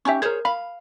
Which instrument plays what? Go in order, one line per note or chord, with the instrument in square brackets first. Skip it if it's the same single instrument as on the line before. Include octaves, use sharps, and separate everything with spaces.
[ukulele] C#4 D#4 G4 [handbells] E5 G#5 C#6
[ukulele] G#4 C5 C#5 [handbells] A#4 G#6
[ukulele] F5 [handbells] B5